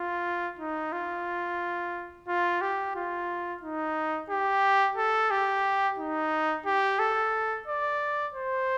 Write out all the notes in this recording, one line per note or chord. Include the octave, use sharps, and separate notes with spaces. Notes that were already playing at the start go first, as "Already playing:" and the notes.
Already playing: F4
D#4
F4
F4
G4
F4
D#4
G4
A4
G4
D#4
G4
A4
D5
C5